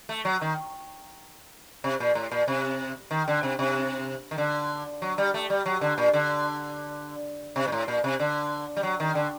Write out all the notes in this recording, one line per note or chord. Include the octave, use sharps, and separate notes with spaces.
A3
F#3
D#3
C3
A#2
A2
A#2
C3
D#3
D3
C3
C3
D#3
D3
F#3
G3
A3
G3
F#3
D3
A#2
D3
C3
A#2
A2
A#2
C3
D3
G3
F#3
D#3
D3